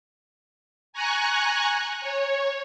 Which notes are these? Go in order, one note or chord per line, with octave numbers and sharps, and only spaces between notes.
G#5 A#5 C#6 F#6
C#5